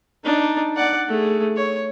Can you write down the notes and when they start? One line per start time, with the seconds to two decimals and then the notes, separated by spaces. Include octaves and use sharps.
0.24 D4 D#4
0.76 D5 F#5
1.08 A3 G#4
1.56 C#5